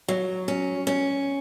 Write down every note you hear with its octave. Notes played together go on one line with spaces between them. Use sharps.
F#3
C#4
C#4